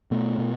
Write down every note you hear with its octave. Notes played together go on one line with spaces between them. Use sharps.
B2 A3
B2